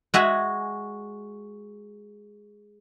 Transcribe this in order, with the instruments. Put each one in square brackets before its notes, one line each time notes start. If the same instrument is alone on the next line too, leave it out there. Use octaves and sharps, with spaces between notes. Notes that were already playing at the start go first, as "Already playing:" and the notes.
[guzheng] G#3 F#4 E5 G#5